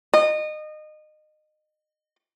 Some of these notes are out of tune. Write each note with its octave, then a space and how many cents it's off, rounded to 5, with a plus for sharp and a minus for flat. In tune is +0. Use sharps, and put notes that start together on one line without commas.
D#5 -25